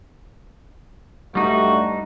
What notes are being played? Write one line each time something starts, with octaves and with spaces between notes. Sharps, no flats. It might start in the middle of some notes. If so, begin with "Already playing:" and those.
G2 G3 A3 D#4 F#4